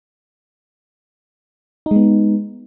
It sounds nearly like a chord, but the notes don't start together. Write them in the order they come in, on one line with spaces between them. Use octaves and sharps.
D#4 G#3 B3